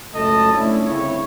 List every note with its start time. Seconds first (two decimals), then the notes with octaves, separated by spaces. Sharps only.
0.15 C#2 F#2 A3 A4 D#5 A5
0.54 A3 C#4 D4 E4
0.84 G1 C#3 C4 E4 C#5